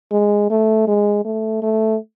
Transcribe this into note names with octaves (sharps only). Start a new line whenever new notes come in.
G#3
A3
G#3
A3
A3